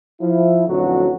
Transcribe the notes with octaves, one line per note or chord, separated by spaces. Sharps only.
F3 E4
A1 F2 D3 F#3 F#4